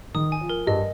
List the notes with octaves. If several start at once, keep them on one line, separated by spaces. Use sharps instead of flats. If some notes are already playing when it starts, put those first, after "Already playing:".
D#3 D#6
G#5
F3
A#4
G2 G3 D#5